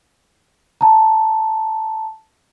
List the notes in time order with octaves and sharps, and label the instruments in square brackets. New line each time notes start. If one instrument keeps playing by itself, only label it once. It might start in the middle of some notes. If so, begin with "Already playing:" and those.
[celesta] A5 A#5